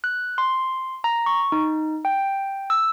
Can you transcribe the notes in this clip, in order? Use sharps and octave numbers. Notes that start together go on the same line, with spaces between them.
F#6
C6
A#5
C#6
D#4
G5
E6